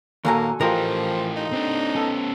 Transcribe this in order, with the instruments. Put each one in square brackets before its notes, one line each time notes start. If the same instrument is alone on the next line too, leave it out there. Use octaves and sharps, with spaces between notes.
[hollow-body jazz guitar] D#2 A#2 A#5 [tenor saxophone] A#3 [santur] F#4 A4 G#5
[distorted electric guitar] E3 A3 [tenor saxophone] F3 [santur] F4 G4 D#5 [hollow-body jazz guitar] A#4
[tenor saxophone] D#4
[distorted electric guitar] C4 D4
[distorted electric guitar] B3 C#4 [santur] A4